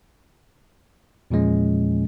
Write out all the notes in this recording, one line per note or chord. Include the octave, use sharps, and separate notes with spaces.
E2 A#2 F3 G#3 C#4